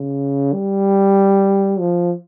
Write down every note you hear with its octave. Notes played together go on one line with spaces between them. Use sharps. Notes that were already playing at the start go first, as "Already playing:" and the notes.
Already playing: C#3
G3
F3